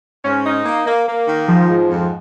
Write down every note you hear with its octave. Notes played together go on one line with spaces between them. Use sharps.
G#2 C#4
D#4
A#3
A#3
A#3
D#3
G#2 F3
G#2
F2